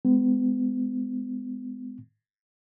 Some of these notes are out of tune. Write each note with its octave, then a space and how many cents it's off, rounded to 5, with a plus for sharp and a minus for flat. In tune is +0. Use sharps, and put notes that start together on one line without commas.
G#3 +0 B3 +40